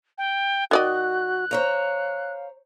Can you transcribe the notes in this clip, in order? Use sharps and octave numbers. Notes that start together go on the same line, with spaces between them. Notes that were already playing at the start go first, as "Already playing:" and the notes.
G5
D#3 F#4 D5 D#5 F#6
C5 C#5 F5 A#5